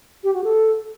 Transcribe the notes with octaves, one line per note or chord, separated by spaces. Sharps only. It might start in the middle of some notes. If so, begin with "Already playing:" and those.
G4
F#4
A4